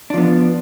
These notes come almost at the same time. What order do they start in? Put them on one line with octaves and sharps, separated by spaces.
D4 F3 B3